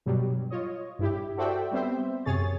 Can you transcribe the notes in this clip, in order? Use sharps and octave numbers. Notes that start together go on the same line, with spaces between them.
G2 B2 F#3 G3
F4 C#5 D#5
G2 E4 G4
F#4 A4 C5 D5 E5 G5
G3 B3 C4 C5 E5
F#2 C3 G#4 C#5 A6